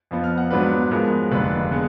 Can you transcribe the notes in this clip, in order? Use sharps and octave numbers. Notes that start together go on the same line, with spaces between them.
F2 F3 B3
F6
F#5
G#2 F#3 B3 D4 B4
G#2 F3 G#3 B3 A#4
F1 D#2 D3 B4
D3 G#3 B3